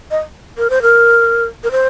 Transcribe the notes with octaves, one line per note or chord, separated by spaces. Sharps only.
D#5
A#4
C5
A#4
A#4
C5